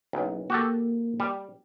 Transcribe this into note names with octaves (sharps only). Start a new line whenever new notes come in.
F#1 B1
A#3 F#4 G4 A4
G3